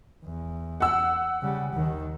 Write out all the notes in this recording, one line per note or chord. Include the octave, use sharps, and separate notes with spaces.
E2
F#5 E6
C#3 G3
D#2 D#3